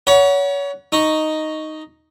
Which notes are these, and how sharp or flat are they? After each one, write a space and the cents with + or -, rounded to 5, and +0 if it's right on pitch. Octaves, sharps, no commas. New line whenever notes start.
C#5 +30 F#5 +0 B5 -40
D#4 +0 C#6 +0